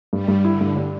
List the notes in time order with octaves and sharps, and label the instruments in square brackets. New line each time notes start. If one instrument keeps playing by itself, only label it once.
[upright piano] G2 [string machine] G3
[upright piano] G2
[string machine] D3 [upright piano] E4
[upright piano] G2
G3